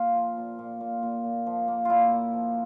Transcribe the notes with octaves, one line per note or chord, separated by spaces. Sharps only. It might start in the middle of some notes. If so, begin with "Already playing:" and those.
Already playing: A#2 A#3 F4
F3
A#2
A#2
A#2
A#2
A#2
F3
A#3
A#2 E4 F4
A#3
F3